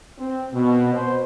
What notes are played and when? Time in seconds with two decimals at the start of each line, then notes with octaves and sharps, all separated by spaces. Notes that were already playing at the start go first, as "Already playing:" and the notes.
0.19 C4
0.54 B2
0.94 C5